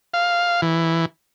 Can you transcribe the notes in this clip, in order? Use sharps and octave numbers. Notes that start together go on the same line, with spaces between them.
F5
E3